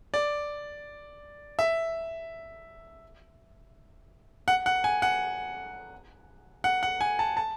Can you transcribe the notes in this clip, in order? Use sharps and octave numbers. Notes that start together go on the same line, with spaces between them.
D5
E5
F#5
F#5
G#5
F#5
F#5
F#5
G#5
A5
A5